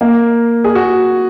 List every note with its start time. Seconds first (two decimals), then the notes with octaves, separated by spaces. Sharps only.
0.01 A#3
0.64 G#4
0.75 F#4